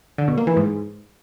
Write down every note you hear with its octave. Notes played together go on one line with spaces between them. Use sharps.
D3
B2
A#3
E3
G#2